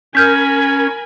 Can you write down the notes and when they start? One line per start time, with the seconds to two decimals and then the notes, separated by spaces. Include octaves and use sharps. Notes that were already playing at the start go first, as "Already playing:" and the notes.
0.15 C#4 A#4 G#5 B5 F6 G6 B6